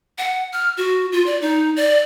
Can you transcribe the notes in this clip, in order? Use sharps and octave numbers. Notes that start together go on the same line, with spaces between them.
F#5
F6
F#4
F4
D5
D#4
D5